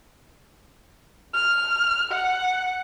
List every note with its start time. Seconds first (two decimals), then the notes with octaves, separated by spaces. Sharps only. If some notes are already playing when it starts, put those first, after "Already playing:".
1.34 F6
2.11 F#5